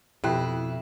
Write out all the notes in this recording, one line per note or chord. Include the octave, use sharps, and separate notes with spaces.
F2 B2 E4 G4 G5 F#6